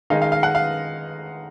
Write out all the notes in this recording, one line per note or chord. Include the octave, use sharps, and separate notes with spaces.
D#3 G#3 D#4 F5
F5
F5
F#5
F5